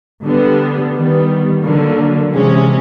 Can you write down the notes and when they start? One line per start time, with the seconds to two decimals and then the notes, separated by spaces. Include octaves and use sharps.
0.24 D3 G3 B3
0.94 D#3 G3 B3
1.63 D3 F#3 A#3
2.32 C3 E3 G#3 C#4